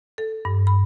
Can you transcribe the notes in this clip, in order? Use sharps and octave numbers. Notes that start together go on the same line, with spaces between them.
A4
G2
B5